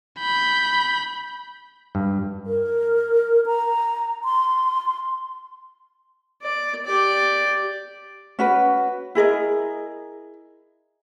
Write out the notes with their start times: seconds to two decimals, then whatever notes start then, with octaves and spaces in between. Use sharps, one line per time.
0.20 B5 G6
1.95 G2
2.46 A#4
3.46 A#5
4.25 C6
6.42 D5
6.86 G4 D5
8.39 C#4 F#4 B4
9.15 E4 G#4 A#4 D#5